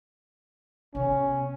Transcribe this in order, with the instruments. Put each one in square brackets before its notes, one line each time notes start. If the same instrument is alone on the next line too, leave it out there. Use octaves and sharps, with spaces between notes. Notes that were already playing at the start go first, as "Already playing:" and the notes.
[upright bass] C3 B3 [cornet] C#4